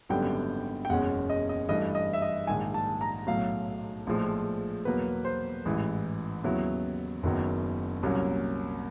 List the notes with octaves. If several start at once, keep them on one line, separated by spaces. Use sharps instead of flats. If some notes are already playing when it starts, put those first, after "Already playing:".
G#1 F#2 D3 G3 B3 G5
G5
F#1 E2 B2 G#3 C#4 F#5
D#5
D#5
G2 E3 A3 D#5
D#5
E5
D#5
A#1 G#2 D#3 G#5
A5
A#5
B1 A2 F#3 F5
A#1 A2 F3 G#3
E2 B2 F#3 A#3 B4
C5
A1 G#2 E3
D#2 C#3 F#3 B3 E4
F#1 F#2 D#3 F#3 B3
C2 A#2 F#3 A#3 C#4